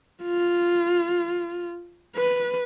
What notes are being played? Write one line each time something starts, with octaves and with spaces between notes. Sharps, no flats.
F4
B4